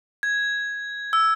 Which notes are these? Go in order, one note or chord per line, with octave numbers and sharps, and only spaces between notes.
G#6
E6